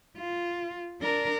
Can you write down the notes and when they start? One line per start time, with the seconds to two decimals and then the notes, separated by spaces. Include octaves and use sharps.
0.17 F4
1.01 D4 A#4